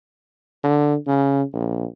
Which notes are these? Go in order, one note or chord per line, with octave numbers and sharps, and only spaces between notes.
D3
C#3
A#1